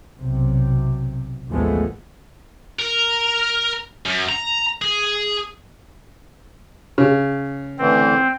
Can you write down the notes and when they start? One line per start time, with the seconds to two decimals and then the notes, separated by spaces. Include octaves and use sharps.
0.19 B1 C3
1.49 A1 D#2 F3 G#3 A3 B3
2.79 A#4
4.06 F#2
4.29 A#5
4.82 G#4
6.98 C#3
7.78 A2 D3 E3 C4